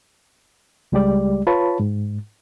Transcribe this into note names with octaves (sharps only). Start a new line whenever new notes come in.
C#2 G3 G#3 G4 D5
F4 B4 C#5 A5 B5
G#2